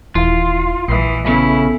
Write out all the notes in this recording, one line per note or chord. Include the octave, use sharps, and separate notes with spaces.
D#1 E3 E4 F4
A#1 E3 D#6 C7
C#3 B3 E4 A4